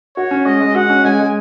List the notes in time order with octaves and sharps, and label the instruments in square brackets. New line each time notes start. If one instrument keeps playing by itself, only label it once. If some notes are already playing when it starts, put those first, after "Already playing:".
[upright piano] F#4 [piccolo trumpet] C#5
[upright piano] C#4
[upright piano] G#3 [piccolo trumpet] D#5
[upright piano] G#3
[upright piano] F#4 [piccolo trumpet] F#5
[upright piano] C#4
[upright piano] G#3 [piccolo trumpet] G#5
[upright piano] G#3